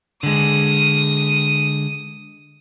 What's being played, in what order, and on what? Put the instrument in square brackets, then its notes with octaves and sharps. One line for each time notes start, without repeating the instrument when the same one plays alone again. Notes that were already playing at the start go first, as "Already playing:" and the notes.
[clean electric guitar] D3 G#3 [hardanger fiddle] D#6